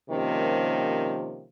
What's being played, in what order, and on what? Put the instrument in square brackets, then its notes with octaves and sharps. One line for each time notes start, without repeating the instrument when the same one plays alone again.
[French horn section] C3 D#3 F3 G3 A#3 C#4